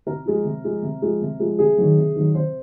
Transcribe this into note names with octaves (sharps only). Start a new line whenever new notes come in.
C3 A#4
F3 G#3
C3
F3 G#3
C3
F3 G#3
C3
F3 G#3
C3 G#4
D#3 F#3
C3
D#3 F#3
C3 C5